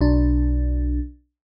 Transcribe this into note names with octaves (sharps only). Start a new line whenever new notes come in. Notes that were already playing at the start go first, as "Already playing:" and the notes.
B1 D4